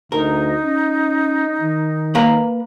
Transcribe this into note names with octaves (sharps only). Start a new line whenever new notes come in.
D2 D#4 A#4
C#4
D#3
A#3 B4 A#5